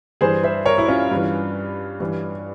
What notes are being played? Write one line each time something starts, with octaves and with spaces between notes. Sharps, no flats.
G2 E3 G#4 C5
C5 E5
A#4 C#5
E4
C#4 F4
G2 E3
G2 E3